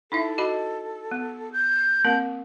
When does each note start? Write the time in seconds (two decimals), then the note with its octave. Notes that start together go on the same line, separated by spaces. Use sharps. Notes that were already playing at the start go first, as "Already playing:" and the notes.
0.12 D#4 E4 A4 E5
0.38 F#4 D#5 B5
1.11 B3
1.53 G6
2.05 A#3 C4 A#4